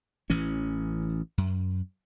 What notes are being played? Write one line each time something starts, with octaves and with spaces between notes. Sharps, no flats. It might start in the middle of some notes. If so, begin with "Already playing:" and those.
A1 E3 C#4
F#2